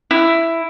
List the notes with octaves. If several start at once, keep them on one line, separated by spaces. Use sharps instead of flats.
E4